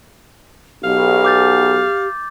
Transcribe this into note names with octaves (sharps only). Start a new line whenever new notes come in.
B1 G4 F5
D6 G6 A6